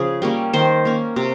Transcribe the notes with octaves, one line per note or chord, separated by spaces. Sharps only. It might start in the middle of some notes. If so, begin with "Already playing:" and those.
Already playing: C#3 F3 G#4
G3 A#3 C#4
D#3 C5
A#3 C#4
C3